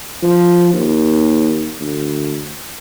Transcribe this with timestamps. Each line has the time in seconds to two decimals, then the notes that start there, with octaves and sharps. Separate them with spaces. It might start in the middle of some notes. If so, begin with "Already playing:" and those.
0.23 F3
0.74 D#2
1.81 D2